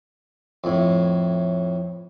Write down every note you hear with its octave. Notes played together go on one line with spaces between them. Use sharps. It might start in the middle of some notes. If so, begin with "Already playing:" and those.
F2 A2